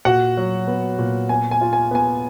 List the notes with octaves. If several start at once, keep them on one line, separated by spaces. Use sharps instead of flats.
A#2 F#4 F#5
F#3
B3
A#2
B3 G#5
G#5
F4
G#5
B3 G#5